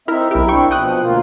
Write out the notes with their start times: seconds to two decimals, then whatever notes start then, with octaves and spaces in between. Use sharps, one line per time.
0.08 C4 D#4 E4 A#4 E5
0.31 B1 E4 G4 A#4 E5
0.48 C4 D4 E4 G5 C#6
0.71 B2 F3 G5 D#6 F#6
1.00 D2 A#3 F4